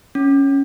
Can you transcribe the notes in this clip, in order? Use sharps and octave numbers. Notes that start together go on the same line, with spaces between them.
C#4